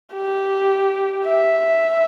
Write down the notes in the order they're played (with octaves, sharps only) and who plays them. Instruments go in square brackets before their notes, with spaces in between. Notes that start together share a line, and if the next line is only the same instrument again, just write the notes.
[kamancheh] G4
E5